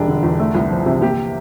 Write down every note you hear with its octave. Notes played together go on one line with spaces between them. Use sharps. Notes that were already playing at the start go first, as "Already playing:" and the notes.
Already playing: E1 G3 D4
D3
E2
A3
C2
F3
C3
A#3 G4